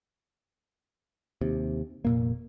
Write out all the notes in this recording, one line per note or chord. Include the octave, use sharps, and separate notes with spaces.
D#2 C3
F1 A#2 A#3